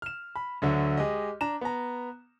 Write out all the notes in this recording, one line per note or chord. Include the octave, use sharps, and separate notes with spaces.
F6 E7
B5
D2 D3 F#3
G#3 G4 D#5
D4 A#5 E7
B3 A#5